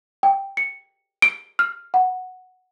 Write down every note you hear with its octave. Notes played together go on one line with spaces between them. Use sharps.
G5
C#7
D7
F6
F#5